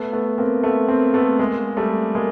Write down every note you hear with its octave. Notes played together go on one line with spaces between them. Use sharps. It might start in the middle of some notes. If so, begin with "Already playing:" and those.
Already playing: A3 B3
A3 B3
A#3 C4
A3 B3
A#3 C4
A3 B3
G#3 A#3
G3 A3
G#3 A#3